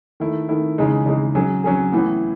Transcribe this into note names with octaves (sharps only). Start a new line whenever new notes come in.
D#3 A3 E4
D#3 A3 E4
C#3 E3 G#3 D#4
C#3 E3 G#3 D#4
F#3 C#4 G#4
F#3 C#4 G#4
A2 E3 B3